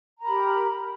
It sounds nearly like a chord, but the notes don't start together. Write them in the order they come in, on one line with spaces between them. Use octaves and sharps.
A#5 A#4 B5 G4